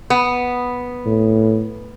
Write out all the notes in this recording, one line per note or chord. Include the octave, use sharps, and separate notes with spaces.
B3
A2